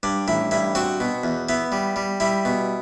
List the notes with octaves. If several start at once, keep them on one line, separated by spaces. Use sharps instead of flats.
G2 D4
A1 E4
G2 E4
C4 F#4
B2
E2
B3 E4
G3
G3
G3 E4
B2